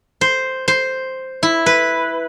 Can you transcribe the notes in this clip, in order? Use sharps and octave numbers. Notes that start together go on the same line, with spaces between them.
C5
C5
E4
B4